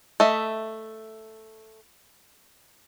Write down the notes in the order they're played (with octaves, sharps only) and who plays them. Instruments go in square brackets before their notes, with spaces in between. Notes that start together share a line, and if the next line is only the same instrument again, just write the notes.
[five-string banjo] A3 D#5 E5